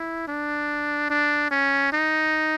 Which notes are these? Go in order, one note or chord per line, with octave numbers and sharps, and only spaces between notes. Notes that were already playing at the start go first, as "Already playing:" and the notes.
Already playing: E4
D4
D4
C#4
D#4